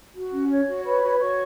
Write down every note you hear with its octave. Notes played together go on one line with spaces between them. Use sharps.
F#4
C#4
C#5
F#4
B4 C#5 B5
F#4
F#4 C#5 C#6